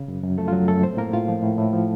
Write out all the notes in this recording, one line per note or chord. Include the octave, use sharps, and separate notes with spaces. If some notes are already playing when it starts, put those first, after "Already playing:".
Already playing: C#3
F#2
F#2
F3 A3 A4
F4
F#2 F#3 F#4
F#2 A3 A4
A2 C4 C5
A2 A#3 A#4
A2 F4 F5
F3
A2
A2
F3